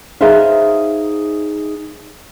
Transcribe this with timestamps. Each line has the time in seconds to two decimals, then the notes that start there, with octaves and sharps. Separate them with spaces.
0.21 D#4 G#4 B4 C5 E5 F5